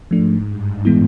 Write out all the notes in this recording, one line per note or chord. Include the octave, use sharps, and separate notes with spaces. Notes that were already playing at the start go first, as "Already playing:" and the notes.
G#2 F3 A3 D4
G2
A2 E3 G#3 B3 E4